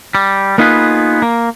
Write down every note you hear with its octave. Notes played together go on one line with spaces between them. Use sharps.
G3
A#3 B3 D#4 F4 G#4 B4
A#3